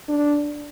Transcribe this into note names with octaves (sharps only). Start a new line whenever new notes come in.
D4